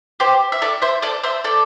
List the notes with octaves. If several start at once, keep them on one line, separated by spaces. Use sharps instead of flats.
G4 C5
E5
A4 D5
C5 E5
A4 D5
C5 E5
A4 D5